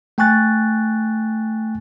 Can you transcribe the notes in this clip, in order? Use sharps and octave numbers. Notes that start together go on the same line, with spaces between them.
A3 G5 G#5 C#6 F#6 A6